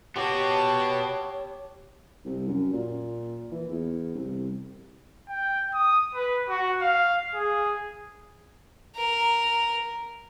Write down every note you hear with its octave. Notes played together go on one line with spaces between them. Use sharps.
B3 F#4 G4 C#5 G5 A5 D6
C2
F#2
A#2
E3
E2
C2
G5
D#6
B4
F#4
F5
G#4
A#4